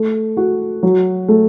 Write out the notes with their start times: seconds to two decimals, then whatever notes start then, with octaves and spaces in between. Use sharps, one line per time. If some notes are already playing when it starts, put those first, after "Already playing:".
Already playing: A3
0.37 F#4
0.83 F#3
1.28 A3